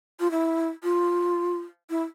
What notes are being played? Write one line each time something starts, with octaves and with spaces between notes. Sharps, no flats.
F4
E4
F4
E4